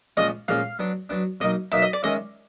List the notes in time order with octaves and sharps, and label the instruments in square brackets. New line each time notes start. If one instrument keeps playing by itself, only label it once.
[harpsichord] A#2 F3 G#3 C#4 [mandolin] D#5
[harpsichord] A#2 F3 G#3 C#4 [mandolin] F5
[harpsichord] F#3 B3 D4
F#3 B3 D4
[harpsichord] B2 F#3 A#3 D#4 [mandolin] D#5
[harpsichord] B2 F#3 A#3 D#4 [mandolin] E5
[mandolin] D#5
D5
[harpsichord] D#3 G#3 C#4 E4 [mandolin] D#5